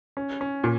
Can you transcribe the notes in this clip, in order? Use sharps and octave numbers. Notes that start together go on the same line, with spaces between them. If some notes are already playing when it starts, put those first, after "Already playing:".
C#4
C#4
A#2